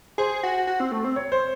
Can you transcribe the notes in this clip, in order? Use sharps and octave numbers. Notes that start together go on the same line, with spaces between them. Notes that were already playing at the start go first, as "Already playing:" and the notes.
G#4 C5
F#4
F#4
C4
A3
C4
C#5
C5